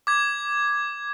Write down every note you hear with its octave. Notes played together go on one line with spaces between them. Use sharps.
D6 G#6